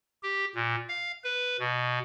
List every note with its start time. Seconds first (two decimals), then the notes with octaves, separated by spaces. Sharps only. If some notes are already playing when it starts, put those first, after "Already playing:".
0.23 G4
0.55 A#2
0.89 F5
1.24 B4
1.59 B2